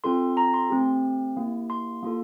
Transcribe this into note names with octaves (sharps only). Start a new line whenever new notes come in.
C4 F4 A4 C6
A#5
C6
A3 C4 G4
A#3 E4 G4
C6
A#3 F4 A4